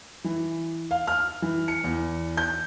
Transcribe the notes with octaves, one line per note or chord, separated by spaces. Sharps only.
E3
F5
F6
E3
C#7
E2
G6